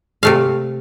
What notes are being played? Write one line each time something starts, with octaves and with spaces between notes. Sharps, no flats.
C3 A3 F5